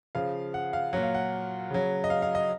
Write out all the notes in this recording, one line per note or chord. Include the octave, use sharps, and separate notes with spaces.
C#3 F3 F5
F#5
F5
A#2 F#3 F#5
F5
F#5
C#3 F#3
D#5
F5
F5
D#5